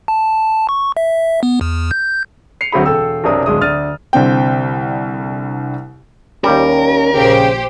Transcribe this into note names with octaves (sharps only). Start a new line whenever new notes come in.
A5
C#6
E5
B3
E2
G6
C7 C#7 F7
D2 F#3 C4 G#4 B5
E1 A4 G5 E6
B1 F#2 C3 D4 A#4 D#6
D1 G#3 D4 D#6
D2 D5 F6 A6 D#7
C2 D3 C4 G5
D#2 G3 C#4 A#4
A#1 C#3 G4 C5